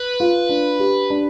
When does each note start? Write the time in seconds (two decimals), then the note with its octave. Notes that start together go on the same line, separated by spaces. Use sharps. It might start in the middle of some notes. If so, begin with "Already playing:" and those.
Already playing: B4
0.20 F4
0.49 D4
0.80 G4
1.10 D4